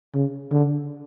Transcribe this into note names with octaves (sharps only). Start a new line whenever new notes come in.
C#3
D3